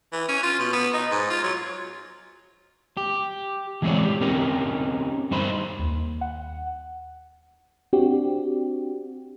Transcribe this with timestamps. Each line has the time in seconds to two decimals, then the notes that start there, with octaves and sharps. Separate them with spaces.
0.12 E3
0.28 C#4
0.43 F4
0.60 B2
0.73 B3
0.94 D#4
1.12 G#2
1.30 F4
1.44 F#3
2.97 G4
3.82 E3 G#3 C4 B4 C#5 D5
4.04 G4
4.21 C4 C#4 D#4 G4 A#4
5.31 G2 D#4 C5 B5
5.79 D#2
6.21 F#5
7.93 C4 D4 F#4 G4